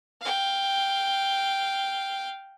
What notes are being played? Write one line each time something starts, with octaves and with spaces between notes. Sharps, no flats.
F5 G5